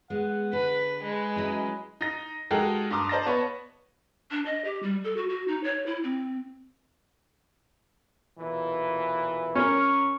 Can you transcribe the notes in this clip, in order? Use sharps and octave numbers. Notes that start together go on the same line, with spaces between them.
G#3 B3 F#5
D3 B4
G#3 B4
F#3 C#4 E4
D#4 A#6
G#3 D#4 F#4 G4 A4 A#4
G2 A#5 C6 D6 D#6
C5 D5 D#5 A5 A#5 A#6
B3 C#5 A5 B5
D4
D#5
G4
G3
A4
F#4
F#4
D#4
C#5
E4
C4
B1 A#2 E3
C#4 A#4 C#6